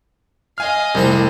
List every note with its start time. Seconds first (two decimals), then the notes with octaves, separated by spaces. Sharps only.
0.58 D#5 F5 G#5 F6
0.95 C2 F2 A3 C4 E4 E5